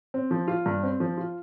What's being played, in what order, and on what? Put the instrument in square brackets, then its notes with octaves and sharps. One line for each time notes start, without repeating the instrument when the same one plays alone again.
[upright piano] C4
F3
F4
G2
C4
F3
F4